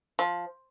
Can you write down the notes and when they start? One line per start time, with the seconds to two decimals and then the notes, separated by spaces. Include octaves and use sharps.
0.19 F3